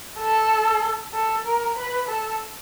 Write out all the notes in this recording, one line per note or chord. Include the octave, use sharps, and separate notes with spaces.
A4
A4
A#4
B4
A4